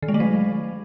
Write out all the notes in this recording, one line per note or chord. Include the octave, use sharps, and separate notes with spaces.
D#3
G#3
A3
F#3